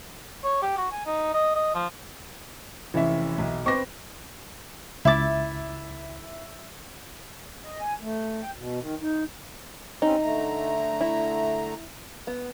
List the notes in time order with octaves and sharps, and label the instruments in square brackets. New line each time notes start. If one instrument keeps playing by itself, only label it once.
[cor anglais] C#5
G4
F#4
G#5
D#4
D#5
D#5
F3
[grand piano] F1 C#4 [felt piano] E3 E5
[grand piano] B1
[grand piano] C4 B4 [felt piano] C#6 D6 A#6
[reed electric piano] C#2 A6 [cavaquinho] E4 D6 [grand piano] E5
[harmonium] D#5
G#5
A3
G5
B2
D#3
D#4
[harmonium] G3 C4 C#4 [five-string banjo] D#4
[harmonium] D3 A3 A#5
[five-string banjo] E4
B3